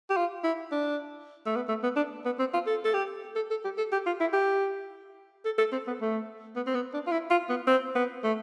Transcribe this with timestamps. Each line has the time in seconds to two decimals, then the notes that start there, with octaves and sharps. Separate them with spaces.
0.10 G4
0.17 F4
0.44 E4
0.72 D4
1.46 A3
1.56 B3
1.69 A3
1.83 B3
1.96 D4
2.25 B3
2.39 C4
2.53 F4
2.67 A4
2.84 A4
2.94 G4
3.36 A4
3.51 A4
3.65 G4
3.78 A4
3.92 G4
4.06 F4
4.20 E4
4.33 G4
5.45 A4
5.58 A4
5.72 C4
5.87 B3
6.01 A3
6.56 B3
6.67 C4
6.75 B3
6.94 D4
7.07 F4
7.12 E4
7.30 F4
7.49 B3
7.67 C4
7.95 B3
8.24 A3